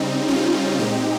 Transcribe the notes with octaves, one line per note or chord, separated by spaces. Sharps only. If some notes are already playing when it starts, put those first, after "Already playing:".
Already playing: C#3 G3 C4 D#4
C#4 F4
A#2 G#3 C4 D#4 G4